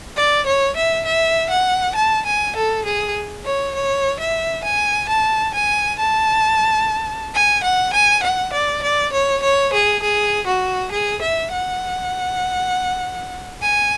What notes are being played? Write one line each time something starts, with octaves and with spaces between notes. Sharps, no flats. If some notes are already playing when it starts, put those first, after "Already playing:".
D5
C#5
E5
E5
F#5
A5
G#5
A4
G#4
C#5
C#5
E5
G#5
A5
G#5
A5
G#5
F#5
G#5
F#5
D5
D5
C#5
C#5
G#4
G#4
F#4
G#4
E5
F#5
G#5